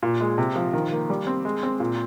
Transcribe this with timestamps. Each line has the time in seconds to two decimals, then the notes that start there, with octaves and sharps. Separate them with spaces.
0.03 A#2
0.21 G#3
0.38 C3
0.56 F3
0.73 D#3
0.92 A#3
1.10 G3
1.27 C4
1.45 G#3
1.63 C4
1.80 A#2